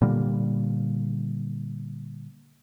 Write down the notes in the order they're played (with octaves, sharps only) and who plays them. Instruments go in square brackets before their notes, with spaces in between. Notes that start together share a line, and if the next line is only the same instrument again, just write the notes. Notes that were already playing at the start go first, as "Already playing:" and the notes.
[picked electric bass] A#2 D3 G3 A#3